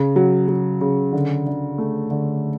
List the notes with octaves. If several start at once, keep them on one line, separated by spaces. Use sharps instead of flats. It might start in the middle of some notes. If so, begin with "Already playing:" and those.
Already playing: C#3
F#3
F#3
C#3
D3
D3
A3
D3